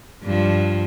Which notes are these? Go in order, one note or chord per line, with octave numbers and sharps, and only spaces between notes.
G2 F3